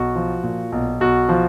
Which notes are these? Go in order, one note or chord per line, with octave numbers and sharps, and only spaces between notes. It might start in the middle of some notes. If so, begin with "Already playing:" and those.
Already playing: B1 F#4
F3
A#2
B1
B1 F#4
F3